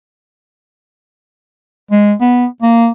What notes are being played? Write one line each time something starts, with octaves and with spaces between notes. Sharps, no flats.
G#3
B3
A#3